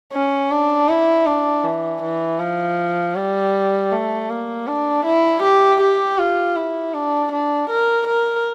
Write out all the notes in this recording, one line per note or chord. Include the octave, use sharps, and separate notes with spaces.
C#4
D4
E4
D4
E3
E3
F3
G3
A3
A#3
D4
E4
G4
G4
F4
E4
D4
D4
A#4
A#4